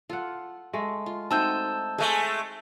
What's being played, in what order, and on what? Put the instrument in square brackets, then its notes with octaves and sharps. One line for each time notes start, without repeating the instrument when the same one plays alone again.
[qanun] F4 [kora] A4 F#5
[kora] G#3 A3
[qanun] F4
[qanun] A3 C4 F#4 [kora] D#4 [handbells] A5 E6 G6
[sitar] G#3 A3 [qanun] A4 E5 G#5